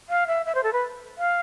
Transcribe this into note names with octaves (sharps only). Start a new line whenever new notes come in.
F5
E5
E5
C5
A4
B4
F5